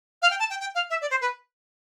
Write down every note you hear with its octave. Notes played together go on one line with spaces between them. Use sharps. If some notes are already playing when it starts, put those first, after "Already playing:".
F5
G5
A5
G5
G5
F5
E5
D5
C5
B4